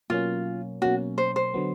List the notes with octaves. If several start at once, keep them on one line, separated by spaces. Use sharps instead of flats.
B2 F#3 A#3 C#4 F4
B2 F#3 A#3 C#4 F#4
C5
C5
D3 F#3 B3